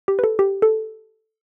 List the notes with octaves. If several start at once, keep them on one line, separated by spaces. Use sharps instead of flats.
G4
B4
A4
G4
A4